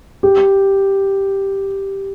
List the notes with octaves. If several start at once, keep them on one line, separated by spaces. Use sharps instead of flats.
G4